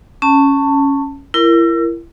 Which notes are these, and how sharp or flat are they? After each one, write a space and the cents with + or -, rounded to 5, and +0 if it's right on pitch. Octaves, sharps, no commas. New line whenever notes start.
C#4 +0 A5 +20
E4 +35 A#4 +0